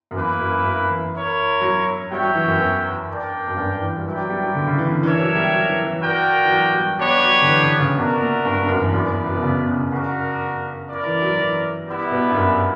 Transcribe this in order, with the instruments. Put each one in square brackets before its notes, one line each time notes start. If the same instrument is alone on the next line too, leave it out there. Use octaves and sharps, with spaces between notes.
[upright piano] F#2
[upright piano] E2 [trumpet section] A#3 E4 B4
[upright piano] F#2
F#2
E3
[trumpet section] E4 A#4 C#5
[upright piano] F#3
[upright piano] G3 [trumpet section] F#4 C#5 E5 G5
[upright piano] F#3
E3
F#2
E2
[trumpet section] D4 A#4 D5 G5
[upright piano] F#2
G2
E3
G3
[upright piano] F#3 [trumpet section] E4 B4 D5 G5
[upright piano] F#3
G3
F#3
D3
C#3
E3
D3
[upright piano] E3 [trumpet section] D4 A#4 C#5 E5
[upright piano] F#3
G3
F#3
E3
E3
[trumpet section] F#4 A#4 D5 G5
[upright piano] E3
F#3
G3
[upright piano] G3 [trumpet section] B3 D4 G4 C#5
[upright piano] F#3
D3
E3
D3
C#3
[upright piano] B2 [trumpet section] D4 F#4 A#4 E5
[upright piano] A#2
G2
G2
F#2
E2
[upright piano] F#2 [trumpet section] B3 E4 B4 D5
[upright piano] E2
F#2
B2
C#3
B2
C#3
[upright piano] C#3 [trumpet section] D4 F#4 A#4
[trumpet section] E4 A#4 D5
[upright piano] E3
F#3
E3
[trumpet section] G3 B3 E4
[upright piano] B2
G2
F#2